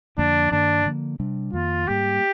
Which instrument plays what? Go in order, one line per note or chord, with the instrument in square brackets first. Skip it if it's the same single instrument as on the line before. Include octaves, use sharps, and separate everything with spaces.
[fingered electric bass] F2 D3 F3 A#3 [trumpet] D4
[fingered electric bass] G2 D#3 A#3 [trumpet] D4
[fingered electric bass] D3 F3 A#3
C3 G3 D4
[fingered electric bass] F2 D#3 A#3 [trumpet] F4
[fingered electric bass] G#2 G3 A#3 [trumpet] G4